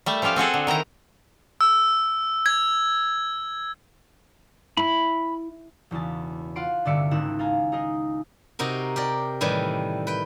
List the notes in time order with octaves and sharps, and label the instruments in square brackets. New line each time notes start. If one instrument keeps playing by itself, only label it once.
[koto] G3 A3 E5
F3 C#4 F4 G4 F5
C4 F#4 G#4 A4
D3
D#3 D#4 E4 A#5
[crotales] E6
G#6
[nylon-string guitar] E4 [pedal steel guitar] B5
[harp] E1 E2 C#3 A5
F4 F#5 C6 D7
C2 G2 D3 D5 E5 C#7
G#1 C#2 D#4 E4 F#6 E7
A4 F5 G#5 A#5
D#4 G#4 A#4 D#5
[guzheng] C3 D#4 F#4 A#4
G4 A#4 D5
A2 D#3 E3 G3
B4 G5